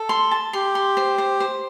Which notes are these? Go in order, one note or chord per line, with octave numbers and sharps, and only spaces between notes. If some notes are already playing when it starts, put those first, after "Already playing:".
Already playing: A4
C6
A5
G4 C6
C6
C5
C5
C5